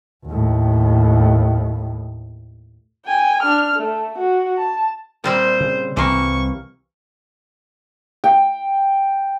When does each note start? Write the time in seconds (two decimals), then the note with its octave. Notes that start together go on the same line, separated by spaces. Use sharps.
0.26 D#2 A2
3.06 G5 G#5
3.42 D4 F6
3.77 A3
4.18 F#4
4.58 A5
5.24 A#2 G3 C4 C5
5.60 C#3
5.97 C2 E3 A#3 C4 C#6
8.24 G5